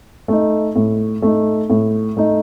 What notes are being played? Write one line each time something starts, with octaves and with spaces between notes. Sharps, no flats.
A3 D#4
A2
A3 D#4
A2
A3 D#4